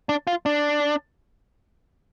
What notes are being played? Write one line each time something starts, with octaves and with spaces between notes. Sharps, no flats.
D4
F4
D4